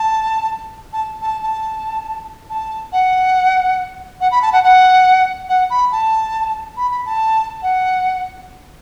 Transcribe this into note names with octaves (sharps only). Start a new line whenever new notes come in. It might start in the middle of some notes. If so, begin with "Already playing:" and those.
Already playing: A5
A5
A5
A5
A5
F#5
F#5
B5
A5
F#5
F#5
F#5
B5
A5
B5
B5
A5
F#5